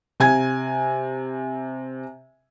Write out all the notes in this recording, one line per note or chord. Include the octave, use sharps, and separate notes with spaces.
C3 G#5 G#6